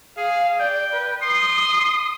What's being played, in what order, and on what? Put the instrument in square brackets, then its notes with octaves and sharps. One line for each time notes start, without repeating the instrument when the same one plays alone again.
[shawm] G#4 [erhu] F5
[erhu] D5 [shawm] G5
[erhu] B4
[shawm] C6 [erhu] D#6